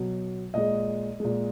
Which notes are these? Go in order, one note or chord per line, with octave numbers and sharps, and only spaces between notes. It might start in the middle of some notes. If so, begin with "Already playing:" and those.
Already playing: B2 F#3
A#2 G#3 D#5
A#2 G#3